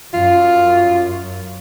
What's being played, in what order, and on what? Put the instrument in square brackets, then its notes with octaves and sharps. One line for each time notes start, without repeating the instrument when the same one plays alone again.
[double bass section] F#2 [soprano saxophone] F4